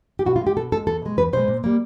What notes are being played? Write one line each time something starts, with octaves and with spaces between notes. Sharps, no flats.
G4
B2 F#4
F4
G#3
G4
B2 A4
G#3 A4
E2 A4
B2 G#3
E2 B4
B2 G#3 C5
A#2
G3 A#3